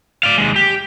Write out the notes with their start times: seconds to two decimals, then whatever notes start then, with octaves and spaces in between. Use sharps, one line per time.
0.23 D5 F5
0.38 D#2 G#3
0.56 G4